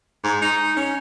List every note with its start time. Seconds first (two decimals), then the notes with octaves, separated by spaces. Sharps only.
0.24 G#2
0.41 D#4
0.76 C#4